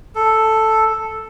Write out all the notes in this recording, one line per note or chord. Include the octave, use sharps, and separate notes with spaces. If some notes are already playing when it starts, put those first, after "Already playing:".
A4